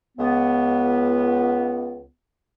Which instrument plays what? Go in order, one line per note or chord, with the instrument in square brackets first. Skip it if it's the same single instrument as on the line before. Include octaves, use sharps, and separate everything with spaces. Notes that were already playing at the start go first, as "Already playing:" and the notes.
[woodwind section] C#2 B3